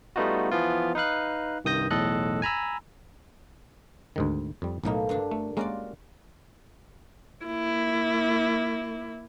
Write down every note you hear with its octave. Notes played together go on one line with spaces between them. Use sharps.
G3 A3 B3 D#4 F4 F#4
E3 F3 B3 F4
D#4 B4 F5 F#6
C2 G2 D#3 D#6 G6 A#6
B1 E2 A2 A4 D#5 F#6
G#5 A#5 B5 E6
D2 G#2 D#3
F2 G3
B1 A2 E3 A3 A#3 D#4
G2 F#3 D4
A3
G#3 A#3 C#4 F4 F#4 D5
A#3 E4